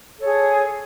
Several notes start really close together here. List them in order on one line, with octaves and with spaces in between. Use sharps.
A4 C#5 G#4